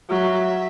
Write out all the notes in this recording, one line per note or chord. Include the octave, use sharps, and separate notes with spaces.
F#3 E5